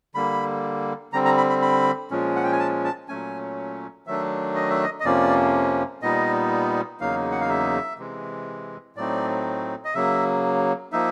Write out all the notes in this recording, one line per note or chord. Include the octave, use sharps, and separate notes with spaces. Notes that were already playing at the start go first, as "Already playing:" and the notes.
D3 G3 A#3 B5
D3 G3 C4 A#5
A#5
B5
B5
B5
A#2 F3 G#3 C#4
F#5
G5
G#5
A5
A5
A#2 F#3 A3 C#4 G#5
D#3 F#3 A3 D4 E5
D#5
E5
D#5
D#5
F2 C3 F3 A#3 C#4 D5
A#2 G3 B3 D#4 D#5
E2 C#3 F#3 A#3 D#4 F5
F#5
F5
E5
C3 E3 G#3
A2 F#3 A3 C4 D#4 D5
D#5
C#3 F#3 A#3 E5
F3 A#3 D#4 E5